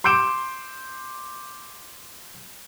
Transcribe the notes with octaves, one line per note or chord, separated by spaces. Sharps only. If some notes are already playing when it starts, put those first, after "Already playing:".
C6 D6 G6 D7 E7